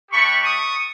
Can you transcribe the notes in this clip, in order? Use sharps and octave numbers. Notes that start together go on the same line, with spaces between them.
A3 D4 G4 B5 C#6
C#6 D#6